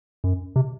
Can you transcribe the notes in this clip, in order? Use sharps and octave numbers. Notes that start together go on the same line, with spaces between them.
F#2
C3